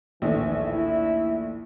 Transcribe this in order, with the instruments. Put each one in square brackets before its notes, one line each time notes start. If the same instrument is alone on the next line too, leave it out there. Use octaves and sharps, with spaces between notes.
[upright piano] A#1 D#2 A2 [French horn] E3
[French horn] E4